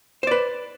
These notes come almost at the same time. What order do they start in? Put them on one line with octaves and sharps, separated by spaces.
C5 D5 B4